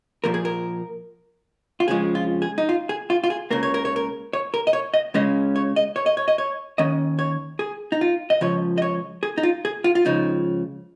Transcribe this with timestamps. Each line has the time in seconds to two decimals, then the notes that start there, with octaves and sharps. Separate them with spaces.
0.24 A#2 F3 A#3 A#4
0.34 G#4
0.45 A#4
1.80 F4
1.88 F2 C#3 F3 G#3 C#4 G#4
2.15 F4
2.42 G#4
2.58 D#4
2.69 F4
2.89 G#4
3.10 F4
3.24 F4
3.30 G#4
3.51 C#2 C#3 A#3 A#4
3.63 C#5
3.74 A#4
3.85 C#5
3.96 A#4
4.33 C#5
4.54 A#4
4.67 D#5
4.73 C#5
4.94 D#5
5.14 C#2 C#3 G#3 C#4 D#5
5.56 C#5
5.76 D#5
5.96 C#5
6.06 D#5
6.17 C#5
6.28 D#5
6.38 C#5
6.78 D#2 D#3 C#4 D#5
7.19 C#5
7.59 G#4
7.92 D#4
8.01 F4
8.30 D#5
8.41 C#2 C#3 F3 C#5
8.78 D#5
8.82 C#5
9.23 G#4
9.38 D#4
9.43 F4
9.65 G#4
9.84 F4
9.95 F4
10.05 C#2 C#3 F3 D#4